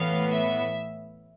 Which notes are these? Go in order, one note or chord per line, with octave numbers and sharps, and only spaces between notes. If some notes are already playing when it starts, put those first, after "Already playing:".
Already playing: A2 E3 B3 F5
E5